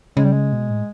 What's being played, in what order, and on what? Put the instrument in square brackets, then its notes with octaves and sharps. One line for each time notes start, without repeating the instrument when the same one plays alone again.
[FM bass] C#3 [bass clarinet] G#3
[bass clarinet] G3
G#3
[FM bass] B2
A2